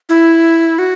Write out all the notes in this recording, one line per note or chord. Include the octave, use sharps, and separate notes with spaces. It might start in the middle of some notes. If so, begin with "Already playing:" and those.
E4
F#4